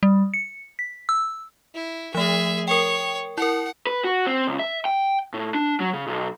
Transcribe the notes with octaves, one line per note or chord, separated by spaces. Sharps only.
G3
C#7
B6
E6
E4
F3 A3 G#4 E5
A#4 C#5 G5
E4 A#4 F#5
B4
F#4
C4
C#2
E5
G5
A2
D4
F#3
C#3
B1